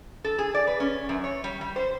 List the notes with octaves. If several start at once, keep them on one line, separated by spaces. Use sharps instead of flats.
A4
G#4
D5
B4
C#4
F#2
C#5
G3
G3
C5